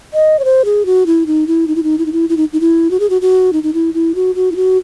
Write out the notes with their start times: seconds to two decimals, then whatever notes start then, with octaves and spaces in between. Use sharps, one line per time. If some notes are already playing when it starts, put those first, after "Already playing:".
0.14 D#5
0.39 C#5
0.45 C5
0.65 G#4
0.86 F#4
1.06 E4
1.27 D#4
1.47 E4
1.68 D#4
1.76 E4
1.83 D#4
1.98 E4
2.06 D#4
2.13 E4
2.29 E4
2.37 D#4
2.53 D#4
2.60 E4
2.91 F#4
3.00 G#4
3.10 F#4
3.21 F#4
3.53 D#4
3.63 D#4
3.74 E4
3.94 E4
4.15 F#4
4.35 F#4
4.52 E4
4.56 F#4